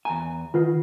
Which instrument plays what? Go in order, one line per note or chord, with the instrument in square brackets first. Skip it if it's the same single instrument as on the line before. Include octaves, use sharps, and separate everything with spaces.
[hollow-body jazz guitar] E2 G#5 [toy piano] A#5
[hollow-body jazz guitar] D#3 [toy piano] F4 B4 F#5